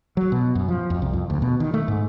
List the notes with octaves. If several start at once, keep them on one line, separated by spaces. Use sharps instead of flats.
F#3
B2
F#2
F3
F2
C2
F2
D2
B2
D#3
A3
G#2